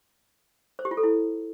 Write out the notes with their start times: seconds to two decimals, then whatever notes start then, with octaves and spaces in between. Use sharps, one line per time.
0.79 C5
0.85 G4
0.91 F4
0.97 A4
1.03 E4